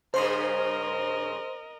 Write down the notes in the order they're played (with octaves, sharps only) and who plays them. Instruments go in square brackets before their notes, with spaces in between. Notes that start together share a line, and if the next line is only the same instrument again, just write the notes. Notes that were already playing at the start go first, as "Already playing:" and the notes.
[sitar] G2 C#3 [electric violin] A#4 D#5 [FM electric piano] C5 C6